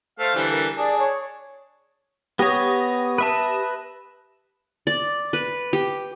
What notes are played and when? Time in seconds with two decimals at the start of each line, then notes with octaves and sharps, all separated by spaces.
0.19 A3 C5 F5
0.35 D3 E3 G3
0.51 A#4
0.77 D4 G#4 D5
0.99 C#5
2.39 B3 G4 C#5 D#6 A#6
3.18 B4 E5 A5
4.87 D5
5.33 B4
5.73 G4